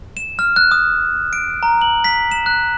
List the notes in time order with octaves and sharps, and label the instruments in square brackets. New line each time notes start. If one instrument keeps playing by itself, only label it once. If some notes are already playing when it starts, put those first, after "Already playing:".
[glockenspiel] E7
F6
F#6
D#6
D7
A#5
F#7
B6
E7
F#6